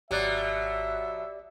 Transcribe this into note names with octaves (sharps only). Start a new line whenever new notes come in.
G#1 B2 F#3 G4 D5 E5 F#6